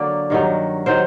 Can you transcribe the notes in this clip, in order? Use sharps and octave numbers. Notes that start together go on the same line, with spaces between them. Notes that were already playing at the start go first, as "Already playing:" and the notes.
Already playing: D3 F#3 A#3 D5
G2 D#3 F#3
D#3 F#3 C5